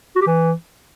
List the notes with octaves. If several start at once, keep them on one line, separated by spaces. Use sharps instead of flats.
F#4
G4
E3